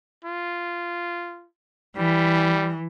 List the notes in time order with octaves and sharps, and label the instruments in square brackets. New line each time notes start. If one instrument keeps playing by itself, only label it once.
[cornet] F4
[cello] E3 [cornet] G3